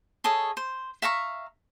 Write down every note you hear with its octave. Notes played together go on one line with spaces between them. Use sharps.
G#4 A4 C#5 D#5
C5
E5 F5 A#5 C#6